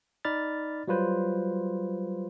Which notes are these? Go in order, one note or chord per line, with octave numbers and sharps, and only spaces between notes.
D#4 D5 B5 F6 A6
F#3 G3 F4 B4 C5